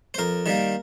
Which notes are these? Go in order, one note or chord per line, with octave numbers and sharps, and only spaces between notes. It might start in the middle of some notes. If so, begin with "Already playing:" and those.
C5
F2 A#4
D#3 G3 A#3